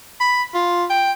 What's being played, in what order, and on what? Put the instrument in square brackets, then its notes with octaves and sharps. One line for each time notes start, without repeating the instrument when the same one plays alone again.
[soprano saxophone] B5
F4
G5